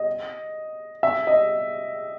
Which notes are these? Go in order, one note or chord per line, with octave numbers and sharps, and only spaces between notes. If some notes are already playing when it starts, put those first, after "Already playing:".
Already playing: D#5
E5
D#5